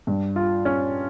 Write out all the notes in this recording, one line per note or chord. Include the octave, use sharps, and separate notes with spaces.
G2
F4
C#4